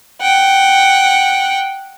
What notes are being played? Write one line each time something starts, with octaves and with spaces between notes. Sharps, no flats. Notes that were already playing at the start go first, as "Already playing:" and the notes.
F#5 G5